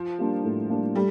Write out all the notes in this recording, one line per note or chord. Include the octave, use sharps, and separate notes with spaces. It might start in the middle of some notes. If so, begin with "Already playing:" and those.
Already playing: F3
G3 A#3 D4
A2
G3 A#3 D4
G3 A3